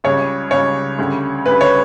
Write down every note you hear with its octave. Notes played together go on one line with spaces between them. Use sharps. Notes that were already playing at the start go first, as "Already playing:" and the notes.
C#2 C#3 G3 C#5
C#2 C#3 G3 C#5
D2 C#3 G3
D2 C#3 G3 B4
C#5